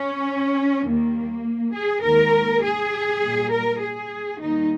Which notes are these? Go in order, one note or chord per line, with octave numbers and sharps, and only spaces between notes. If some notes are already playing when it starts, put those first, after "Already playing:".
Already playing: C#4
D#2 D#3 G3 A#3
G#4
D#2 D#3 G#3 A#4
G#4
A#2 G3
A#4
G#4
D#2 D#3 G3 D#4